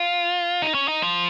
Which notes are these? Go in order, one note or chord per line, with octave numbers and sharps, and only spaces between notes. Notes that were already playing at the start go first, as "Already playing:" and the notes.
Already playing: F4
D#4
C#4
D#4
F3